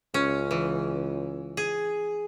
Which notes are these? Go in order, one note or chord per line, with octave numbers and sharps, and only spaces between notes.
C#2 C#4
E3
G#4